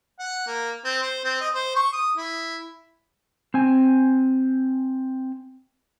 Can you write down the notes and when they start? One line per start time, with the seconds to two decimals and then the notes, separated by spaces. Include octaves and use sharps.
0.19 F#5
0.47 A#3
0.85 C4
1.02 C5
1.25 C4
1.41 D#5
1.55 C5
1.76 C#6
1.93 D#6
2.17 E4
3.54 C4 G#5